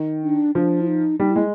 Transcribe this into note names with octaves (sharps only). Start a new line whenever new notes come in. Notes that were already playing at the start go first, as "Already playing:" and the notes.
Already playing: D#3
D4
F3 D4
E4
D#4
G3 D#4
E4
G#3